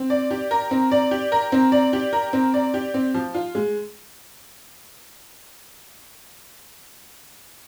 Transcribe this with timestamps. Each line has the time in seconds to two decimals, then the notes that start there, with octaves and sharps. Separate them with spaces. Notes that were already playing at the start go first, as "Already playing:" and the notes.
Already playing: C4
0.10 D5
0.31 G4
0.51 A#4
0.71 C4
0.91 D5
1.11 G4
1.32 A#4
1.52 C4
1.72 D5
1.93 G4
2.13 A#4
2.33 C4
2.54 D5
2.74 G4
2.94 C4
3.14 F3
3.34 F4
3.55 G#3